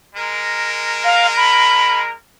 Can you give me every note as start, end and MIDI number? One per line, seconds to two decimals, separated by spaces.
0.16 2.11 56
0.16 2.11 70
1.04 1.27 77
1.37 2.00 83